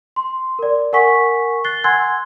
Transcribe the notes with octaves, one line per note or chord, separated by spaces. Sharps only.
C6
A#4 D5
A#4 F#5 G#5 C#6 B6
F#6 A6 C7 G7
F#5 G#5 C6 E6 F#6 G#6